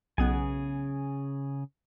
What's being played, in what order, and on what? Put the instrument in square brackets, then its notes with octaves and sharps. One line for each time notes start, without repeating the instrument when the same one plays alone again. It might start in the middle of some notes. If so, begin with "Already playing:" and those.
[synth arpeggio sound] B1 B3 [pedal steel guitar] C#3 G#4 G#5